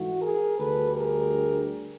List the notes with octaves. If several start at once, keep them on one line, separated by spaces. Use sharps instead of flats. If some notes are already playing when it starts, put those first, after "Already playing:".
Already playing: G#2 E3 A3 F#4
G#4 A#4
D2 D3 G3 A4 B4
G#4 A#4